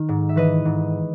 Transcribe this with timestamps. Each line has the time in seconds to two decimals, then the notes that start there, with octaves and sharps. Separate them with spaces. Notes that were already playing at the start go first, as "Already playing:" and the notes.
Already playing: D#3
0.09 G#2
0.29 E5
0.36 E3 B4 D#5
0.65 G#2